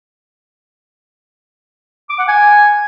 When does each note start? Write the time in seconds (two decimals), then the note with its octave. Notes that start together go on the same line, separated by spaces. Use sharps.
2.10 D6
2.19 F#5
2.28 G#5